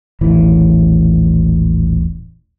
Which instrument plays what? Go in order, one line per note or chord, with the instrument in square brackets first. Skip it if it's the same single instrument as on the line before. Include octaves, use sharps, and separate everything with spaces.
[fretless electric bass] D#1 A1 E3